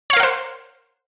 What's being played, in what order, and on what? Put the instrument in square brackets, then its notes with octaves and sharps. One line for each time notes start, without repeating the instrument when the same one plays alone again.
[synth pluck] C#5
F5
A#4
F#5
C5